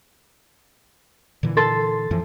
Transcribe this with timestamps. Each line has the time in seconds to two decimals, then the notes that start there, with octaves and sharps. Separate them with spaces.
1.43 A#2 D3 E3
1.57 A4 C6 A6
2.11 F#2 E3 F3